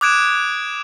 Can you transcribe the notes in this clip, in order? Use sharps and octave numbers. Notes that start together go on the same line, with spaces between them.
D6 D#6 F#6 G#6 D7 E7